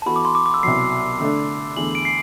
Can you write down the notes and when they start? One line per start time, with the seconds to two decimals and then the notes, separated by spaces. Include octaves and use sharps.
0.02 A5
0.06 E3 B3 F#4 A4 B5
0.16 D6
0.25 C6
0.35 D6
0.46 D6
0.54 E6
0.63 C2 B2 F#3 C7
1.20 D3 A3 D4
1.77 E2 D3 A3 F#7
1.95 D7
2.05 C7